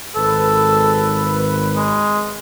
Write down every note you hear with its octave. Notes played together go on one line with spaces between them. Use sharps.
G#1 A4 B4
G#3